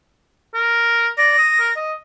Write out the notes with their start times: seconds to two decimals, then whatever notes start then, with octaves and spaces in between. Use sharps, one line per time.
0.54 A#4
1.18 D5 A#6
1.38 D#6
1.59 A#4
1.76 D#5